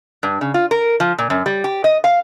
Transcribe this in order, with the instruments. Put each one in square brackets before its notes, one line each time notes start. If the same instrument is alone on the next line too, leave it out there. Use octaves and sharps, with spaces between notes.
[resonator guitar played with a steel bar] G2
C#3
F4
A#4
F3
A#2
F#2
G3
G4
D#5
F5